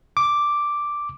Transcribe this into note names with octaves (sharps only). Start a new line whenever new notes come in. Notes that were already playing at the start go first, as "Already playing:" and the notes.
D6